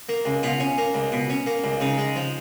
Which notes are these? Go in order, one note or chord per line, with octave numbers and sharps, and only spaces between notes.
A#3
C#2
B2 F4
C#4
A#3
C#2
B2
C#4
A#3
C#2
C#3 D#4
G#3
F3